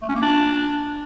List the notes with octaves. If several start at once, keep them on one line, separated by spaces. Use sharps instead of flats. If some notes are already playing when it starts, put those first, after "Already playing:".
A3
C#4
A#3
D4